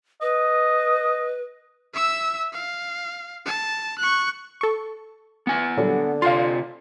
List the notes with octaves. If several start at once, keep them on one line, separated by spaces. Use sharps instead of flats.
B4 D#5
E5 E6
F5
A5
C#6 F#6
A4 C#6
B3 G#5
A#2 D3 F#3 G3
C3 F4 F5 C6